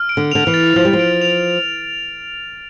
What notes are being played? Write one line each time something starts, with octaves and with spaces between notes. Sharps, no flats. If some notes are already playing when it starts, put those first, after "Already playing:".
Already playing: F6
D7
D3
D3 F7
E3
A6
F3 F6
G3
F3
D7
F7